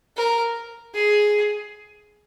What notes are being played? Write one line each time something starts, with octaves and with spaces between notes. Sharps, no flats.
A#4
G#4